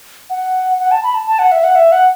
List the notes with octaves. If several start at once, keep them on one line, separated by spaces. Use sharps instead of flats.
F#5
F#5
A5
B5
A5
A5
F#5
E5
F#5
E5
F#5